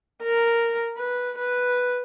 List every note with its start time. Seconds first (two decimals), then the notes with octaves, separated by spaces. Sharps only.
0.23 A#4
0.97 B4
1.38 B4